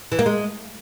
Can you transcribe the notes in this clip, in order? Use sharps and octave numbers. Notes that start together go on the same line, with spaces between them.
E3
A#3
G#3